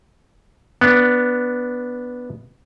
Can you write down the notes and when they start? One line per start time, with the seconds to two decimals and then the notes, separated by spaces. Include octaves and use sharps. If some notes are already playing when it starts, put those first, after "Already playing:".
0.81 B3 D4